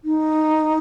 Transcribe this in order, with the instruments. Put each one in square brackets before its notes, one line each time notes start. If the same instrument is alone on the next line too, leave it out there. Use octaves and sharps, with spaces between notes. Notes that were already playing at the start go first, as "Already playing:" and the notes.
[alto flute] D#4